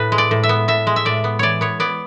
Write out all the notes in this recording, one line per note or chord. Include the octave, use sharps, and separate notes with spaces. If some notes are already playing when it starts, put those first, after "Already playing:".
Already playing: A2 B4
G#3
D5
A2
E5
B3
A2 E5
G#3
E5
A2 D5
B3
E3 C#5 D5
B3 C#5
B3 D5